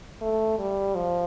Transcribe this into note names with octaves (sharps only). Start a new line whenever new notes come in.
A3
G3
F3